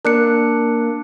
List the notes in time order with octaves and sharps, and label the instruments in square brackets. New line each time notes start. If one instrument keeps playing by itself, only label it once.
[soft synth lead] A#3 [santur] D4 [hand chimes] A#4 F#6 C#7